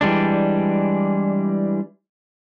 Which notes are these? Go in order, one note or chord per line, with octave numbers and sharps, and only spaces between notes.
E3 G3 G#3 D4